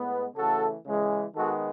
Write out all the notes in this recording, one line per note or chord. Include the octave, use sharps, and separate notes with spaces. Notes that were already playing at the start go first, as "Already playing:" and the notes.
Already playing: A2 G#3 B3
C#3 E3 A3 F#4 A4
C#3 E3 G#3
D#3 G#3 B3 F#4 A4